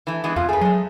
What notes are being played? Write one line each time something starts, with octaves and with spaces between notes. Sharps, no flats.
E3 A3
E3 G#3 B3
F2 B2 F4
A3 G#4 B4
F#3 G#3 A3